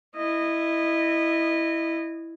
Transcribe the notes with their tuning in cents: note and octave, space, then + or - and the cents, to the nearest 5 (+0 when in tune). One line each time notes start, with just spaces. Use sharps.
E4 +0 D#5 -20